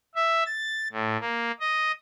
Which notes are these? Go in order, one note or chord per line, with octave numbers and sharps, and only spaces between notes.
E5
A6
A2
A#3
D#5